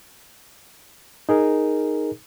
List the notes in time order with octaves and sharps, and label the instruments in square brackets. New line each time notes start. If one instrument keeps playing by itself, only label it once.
[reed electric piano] D#4 G#4 A#4